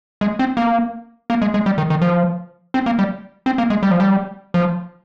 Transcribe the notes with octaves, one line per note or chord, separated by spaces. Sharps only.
G#3
C4
A#3
A#3
G#3
G#3
G3
D#3
D#3
F3
C4
A#3
G3
C4
A#3
G#3
G3
F3
G3
F3